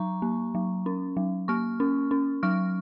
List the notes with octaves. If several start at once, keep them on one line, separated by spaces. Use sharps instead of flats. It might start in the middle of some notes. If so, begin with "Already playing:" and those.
Already playing: F#3 A#5 C#6
A#3
F#3
C#4
F#3
A#3 C#6 F6
C#4
C#4
F#3 C#6 F6